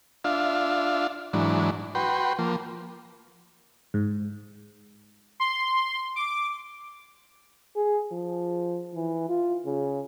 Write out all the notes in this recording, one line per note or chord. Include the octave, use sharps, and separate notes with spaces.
D4 F4 E5 F5
G#2 E3 F#3 D4
F#4 B4 G5 C6
F3 A#3
G#2
C6
D6
G#4
F3
E3
F4
C#3